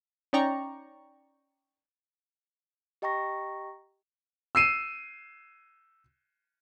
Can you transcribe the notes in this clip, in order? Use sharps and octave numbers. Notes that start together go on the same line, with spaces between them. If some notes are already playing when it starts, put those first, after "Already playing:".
C#4 D#4 D5 G5 A#5 C#6
G4 D#5 G5 A#5 C#6 A#6
E6 C7 D#7 E7